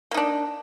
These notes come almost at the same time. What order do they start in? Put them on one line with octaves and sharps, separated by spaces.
A#3 D#4 D4